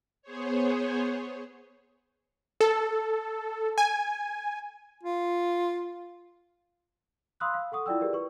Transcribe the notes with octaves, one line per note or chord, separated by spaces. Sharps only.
B3 G#4 C5 C#5
A4
G#5
F4
F5 B5 C6 D#6 E6 F#6
F5
A4 F#5 C#6 D#6
E4 F4 D5 G5 E6
G4 G#4 A#4 B4 D5
B4 C#6